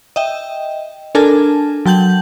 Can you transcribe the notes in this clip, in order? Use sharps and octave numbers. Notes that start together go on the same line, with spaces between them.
D#5 E5 G5
D4 A4 A#4 G#5 A5 F6
F#3 G5 A5 G6 F#7